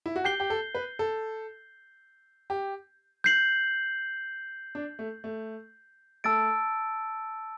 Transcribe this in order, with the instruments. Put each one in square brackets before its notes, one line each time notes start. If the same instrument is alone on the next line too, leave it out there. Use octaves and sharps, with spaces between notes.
[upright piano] E4
F#4
[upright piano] G4 [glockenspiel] G6 C7 G7
[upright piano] G4
A4
B4
A4
G4
[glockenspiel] G6 C7 F#7
[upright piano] D4
A3
A3
[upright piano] A3 [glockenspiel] A5 E6 A6 D7